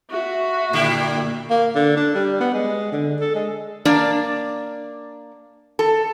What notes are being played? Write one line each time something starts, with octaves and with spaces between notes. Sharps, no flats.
F#4 E5
A#2 D3 G3 E4
A#3
D3
D4
G3
B3
G#3
D3
A4
G#3
A#3 D4 D5
A4